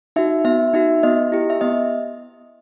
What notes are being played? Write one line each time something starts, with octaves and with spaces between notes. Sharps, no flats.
D#4 F#4 E5
B3 E5
D#4 F#4 E5
B3 D#5
E4 G4
E5
B3 D#5